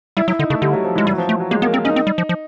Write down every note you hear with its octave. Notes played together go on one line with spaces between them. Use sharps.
G3 E4
F#3 E4
D3 D#4
C#3 A3
D3 G3
F#3
F3
E3 G#3
E3 G3
F#3
F3
A3
F#3
G#3 A#3
A#3 B3
A#3 C4
C#4 D#4
C4
G3
F3
F3